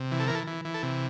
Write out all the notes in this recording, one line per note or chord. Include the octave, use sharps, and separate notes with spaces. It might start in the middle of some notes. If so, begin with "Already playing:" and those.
Already playing: C3
E3
A4
E3 A#4
A4
E3
E3
A4
C3